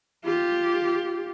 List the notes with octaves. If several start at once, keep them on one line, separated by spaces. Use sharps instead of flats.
F4 G4